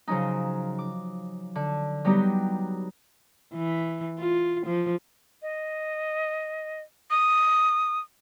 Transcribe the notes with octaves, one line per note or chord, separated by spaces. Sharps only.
C#3 F3 F#3 C#4 D#4
D6
D3
F#3 G3 B3 D#4 G4
E3
F4
F3
D#5
D#6